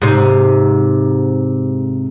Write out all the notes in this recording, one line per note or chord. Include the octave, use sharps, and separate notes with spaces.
G#2 C3